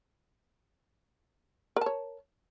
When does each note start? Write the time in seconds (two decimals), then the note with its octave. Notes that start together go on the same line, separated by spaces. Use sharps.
1.76 A#4
1.81 A5
1.86 C#5